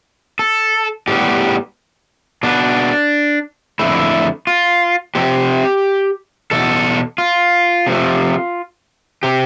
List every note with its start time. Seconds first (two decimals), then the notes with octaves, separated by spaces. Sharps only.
0.39 A4
1.07 A2 G3 B3 G4
2.43 B2 B3 D4
3.79 F2 D3 A3 E4
4.47 F4
5.15 C3 F3 C4 G4
6.51 E2 B2 A4
7.18 F4
7.86 C3 F3 A3
9.23 C3 G4